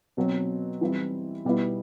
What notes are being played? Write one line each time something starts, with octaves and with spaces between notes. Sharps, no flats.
B2 F#3 C4
E3 G3 C4 E4
B2 G3 B3 E4